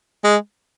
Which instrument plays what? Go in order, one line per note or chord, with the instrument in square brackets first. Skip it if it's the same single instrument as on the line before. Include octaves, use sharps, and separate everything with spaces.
[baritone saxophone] G#3